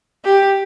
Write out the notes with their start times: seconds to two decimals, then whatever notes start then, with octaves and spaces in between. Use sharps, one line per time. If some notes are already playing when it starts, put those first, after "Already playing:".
0.25 G4